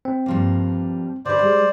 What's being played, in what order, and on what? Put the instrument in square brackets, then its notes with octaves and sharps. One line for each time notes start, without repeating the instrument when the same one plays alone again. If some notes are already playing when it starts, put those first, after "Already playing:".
[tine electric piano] C4
[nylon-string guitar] G2 F3 A#3
[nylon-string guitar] D3 B4 [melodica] C5 D5
[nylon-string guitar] G3 G#3